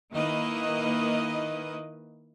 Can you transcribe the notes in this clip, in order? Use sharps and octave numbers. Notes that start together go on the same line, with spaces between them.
D#3 A#3 E4 B4 D#5